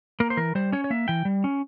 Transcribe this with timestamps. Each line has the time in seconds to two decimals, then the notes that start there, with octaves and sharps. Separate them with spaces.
0.20 A#3 A#4
0.30 C5
0.37 E3 A#4
0.55 G3 C5
0.72 C#4 C#5
0.84 C#5
0.90 A#3 E5
1.08 E3 G5
1.25 G3
1.44 C#4